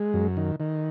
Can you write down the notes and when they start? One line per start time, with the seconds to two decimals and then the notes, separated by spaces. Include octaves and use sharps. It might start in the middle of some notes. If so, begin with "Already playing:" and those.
Already playing: G#3
0.14 F#2
0.37 D#3
0.60 D#3